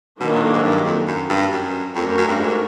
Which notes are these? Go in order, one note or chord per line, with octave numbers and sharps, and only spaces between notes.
B2 D#3 F#3 A#3 D4
A#2
A2
G#2
G2
F2
F#2
G2
F#2
F2 A3 D4 F#4 A#4 C#5
F#2
F#2
G2
G#2